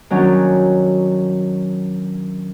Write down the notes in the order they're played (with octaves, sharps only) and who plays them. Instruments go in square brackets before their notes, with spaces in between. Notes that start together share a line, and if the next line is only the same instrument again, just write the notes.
[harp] D#3 F#3 C#4 D4